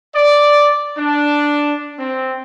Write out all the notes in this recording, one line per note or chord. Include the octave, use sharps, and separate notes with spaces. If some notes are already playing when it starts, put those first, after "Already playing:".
D5
D4
C4